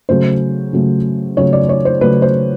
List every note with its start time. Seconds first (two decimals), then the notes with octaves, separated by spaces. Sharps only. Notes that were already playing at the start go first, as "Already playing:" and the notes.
0.09 C#3 F#3 A3 C5
0.73 C#3 F#3 A3
1.37 C#3 F#3 A3 C#5
1.53 D5
1.69 C#5
1.85 C5
2.01 C#3 F#3 A3 B4
2.22 C5